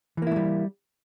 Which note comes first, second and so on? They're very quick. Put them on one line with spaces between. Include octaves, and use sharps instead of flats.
E3 A#3 E4 A3 G3